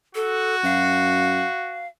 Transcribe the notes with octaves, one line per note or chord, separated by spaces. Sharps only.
F#4 A4
F#2 F5